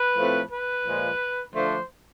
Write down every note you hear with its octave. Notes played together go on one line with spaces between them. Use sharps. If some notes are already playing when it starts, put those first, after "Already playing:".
Already playing: B4
A2 F3 A3 C4
B4
A#2 F3 G#3
D3 F3 A3 D4 C5